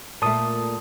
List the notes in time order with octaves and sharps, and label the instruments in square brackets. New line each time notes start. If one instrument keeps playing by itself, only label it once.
[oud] A#2 A3 [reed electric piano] A5 D#6